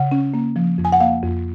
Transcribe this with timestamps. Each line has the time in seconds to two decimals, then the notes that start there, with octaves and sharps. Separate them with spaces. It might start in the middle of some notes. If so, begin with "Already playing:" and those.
Already playing: C#3 F#5
0.11 C#4
0.34 A#3
0.56 F3
0.78 F2
0.85 G#5
0.92 F#5
1.00 A#3 F5
1.23 F2